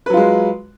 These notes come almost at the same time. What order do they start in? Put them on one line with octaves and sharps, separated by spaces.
B4 F#3 F4 G#3